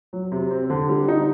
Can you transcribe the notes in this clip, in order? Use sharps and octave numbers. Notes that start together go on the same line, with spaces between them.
F#3
C3
C4
D3
G3
D#4